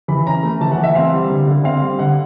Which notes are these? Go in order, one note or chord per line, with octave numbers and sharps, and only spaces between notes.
E3 B5
C#4 A#5
A3
E3 A5
F#5
E3
E5
C4 F5
G3
D3
D3
C4 F5
G3
D3 F#5